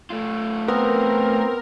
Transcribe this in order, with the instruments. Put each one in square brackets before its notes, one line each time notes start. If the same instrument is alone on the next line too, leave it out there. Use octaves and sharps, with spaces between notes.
[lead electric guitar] A3 F4
[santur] B3 [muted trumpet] C4 [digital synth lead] A#4